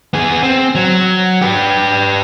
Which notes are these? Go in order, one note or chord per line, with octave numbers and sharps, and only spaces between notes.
B3 G#4
C4
F#3
G4 B4